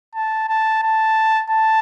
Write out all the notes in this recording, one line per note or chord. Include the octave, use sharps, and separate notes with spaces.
A5
A5
A5
A5